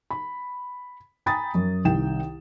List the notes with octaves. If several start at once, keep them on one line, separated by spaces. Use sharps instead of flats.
B5
G5 G#5 A#5 B5 D#6 A6
F#2
C2 D#3 G5 E7